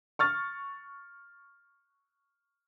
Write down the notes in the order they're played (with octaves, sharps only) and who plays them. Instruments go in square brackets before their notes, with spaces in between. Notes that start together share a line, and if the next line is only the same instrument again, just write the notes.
[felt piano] C#6 F6 A6